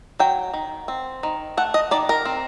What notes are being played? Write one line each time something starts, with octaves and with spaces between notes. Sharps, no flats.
F#3 G5
D#3
C4
D#3
A3 F#5
D#5
D#3 D5
A#4
C4